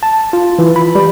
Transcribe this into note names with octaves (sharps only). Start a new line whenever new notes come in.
A5
F4
E3
B5
G3